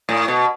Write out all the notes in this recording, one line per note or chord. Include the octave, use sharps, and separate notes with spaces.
A2
B2